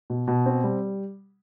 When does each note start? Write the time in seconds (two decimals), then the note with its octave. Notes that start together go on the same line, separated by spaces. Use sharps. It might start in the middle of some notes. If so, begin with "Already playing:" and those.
0.10 B2
0.28 B2
0.46 C4
0.64 G3